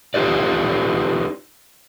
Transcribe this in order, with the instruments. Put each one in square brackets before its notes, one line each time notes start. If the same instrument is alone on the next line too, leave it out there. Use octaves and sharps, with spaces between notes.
[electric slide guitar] D#4 F4 G4 B4 D5